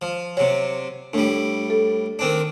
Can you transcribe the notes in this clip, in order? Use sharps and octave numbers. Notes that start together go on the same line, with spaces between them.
F3
C3 F#3 C#5
A2 G3 D4
A4
D#3 C4 D4